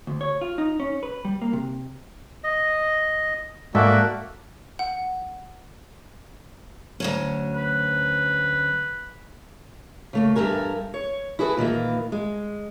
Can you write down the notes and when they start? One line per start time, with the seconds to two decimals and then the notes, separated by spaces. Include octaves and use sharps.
0.07 D2
0.21 C#5
0.41 F4
0.58 D#4
0.80 C#4
1.03 B4
1.25 G3
1.41 A#3
1.53 C3
2.44 D#5
3.75 G#2 A#3 F#4 A4 D5 E5
4.79 F#5
7.00 D2 F#3 C#4
7.56 B4
10.13 C#3 A3 A#3
10.35 E2 G2 G4 A4 A#4 G#5
10.94 C#5
11.39 E4 F#4 G#4 A4 B4
11.57 A#2 D#3 E3 A#3
12.12 G#3